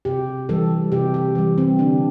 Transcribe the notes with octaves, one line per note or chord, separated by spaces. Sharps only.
C3 G4
E3 G3 A4
C3 G4
G4
E3 G3
C4
D3 D4